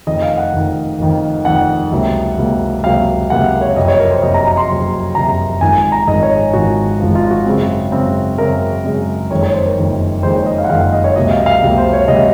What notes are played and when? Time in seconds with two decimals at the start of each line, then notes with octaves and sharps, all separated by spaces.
0.07 F1 F2 D#3 D#5
0.22 F5
0.37 F#5
0.53 F1 F2 D#3
0.99 F1 F2 D#3
1.45 F1 F2 D#3 F#5
1.91 C#2 C3 F#3 A#3
2.37 C#2 C3 F#3 A#3
2.84 C#2 C3 F#3 A#3 F5
3.30 C#2 C3 F#3 A#3 F#5
3.61 C#5
3.76 F#1 F2 C3 F#3 D#5
3.88 C#5
4.00 A#4
4.11 C5
4.22 F#1 F2 C3 F#3 D#5
4.34 A#5
4.46 A#5
4.57 C6
4.69 F#1 F2 C3 F#3
5.15 F#1 F2 C3 F#3 A#5
5.61 G#1 G#2 F3 G#5
5.77 G#5
5.92 A#5
6.07 G#1 G#2 F3 D#5
6.23 C#5
6.53 G#1 G#2 F3 F#4
7.00 G#1 G#2 F3
7.15 F4
7.30 F#4
7.46 F#2 C#3 G#3 C4
7.92 F#2 C#3 G#3 C4
8.38 F#2 C#3 G#3 C4 A#4
8.84 F#2 C#3 G#3 C4
9.31 F#1 F2 D#3 G#3 C#5
9.43 C#5
9.54 C5
9.66 A#4
9.77 F#1 F2 D#3 G#3
10.23 F#1 F2 D#3 G#3 C5
10.35 C#5
10.46 D#5
10.58 F5
10.64 F#5
10.70 F#1 F2 D#3 G#3 F5
10.81 F5
10.93 D#5
11.04 C#5
11.16 C#2 C3 F#3 A#3 D#5
11.31 F5
11.46 F5
11.62 C#2 C3 F#3 A#3
11.77 C5
11.93 C#5
12.08 C#2 C3 F#3 A#3 D#5